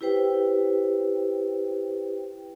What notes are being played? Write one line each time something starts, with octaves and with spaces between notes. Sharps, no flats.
E4 G4 B4 C5 G5